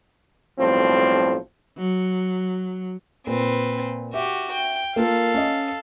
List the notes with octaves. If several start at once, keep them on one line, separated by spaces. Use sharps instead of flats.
B1 A2 F3 G3 C4
F#3
A#2 C4 B4
F#4 G4 E5
G5
A#3 F4 A4 A#4 F5
C#4 D#5